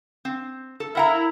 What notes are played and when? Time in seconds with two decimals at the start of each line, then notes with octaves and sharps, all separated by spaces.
0.25 C4
0.80 A4
0.95 E4 A#4 F#5 A#5